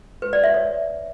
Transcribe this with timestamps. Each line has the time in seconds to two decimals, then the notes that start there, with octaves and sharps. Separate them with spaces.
0.22 B4
0.33 D5
0.44 E5
0.54 C#5